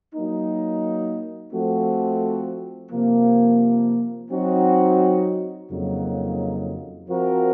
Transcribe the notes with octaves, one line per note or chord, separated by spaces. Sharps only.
F#3 A#3 D#4
F3 A3 C4 F#4
C3 F3 A#3
F#3 C4 D#4 F#4
F2 C#3 F#3 A#3 D#4
F3 C4 F#4 A#4